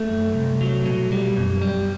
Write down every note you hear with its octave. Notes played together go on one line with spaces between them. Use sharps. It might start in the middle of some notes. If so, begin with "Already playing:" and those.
Already playing: A3
F#2
C2
F#3
B2
G3
F#2
G3